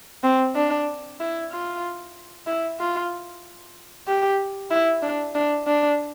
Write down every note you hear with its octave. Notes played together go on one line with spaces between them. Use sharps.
C4
D4
E4
F4
E4
F4
G4
E4
D4
D4
D4